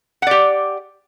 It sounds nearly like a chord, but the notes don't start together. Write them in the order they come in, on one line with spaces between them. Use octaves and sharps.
F#5 D5 G4